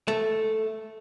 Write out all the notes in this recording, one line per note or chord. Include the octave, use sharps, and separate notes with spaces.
A3